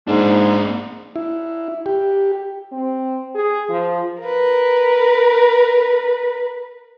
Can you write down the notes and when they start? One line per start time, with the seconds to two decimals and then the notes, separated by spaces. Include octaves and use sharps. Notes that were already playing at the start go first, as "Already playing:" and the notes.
0.08 G#2 A#3 D4
1.16 E4
1.86 G4
2.72 C4
3.35 G#4
3.69 F3
4.22 A#4 B4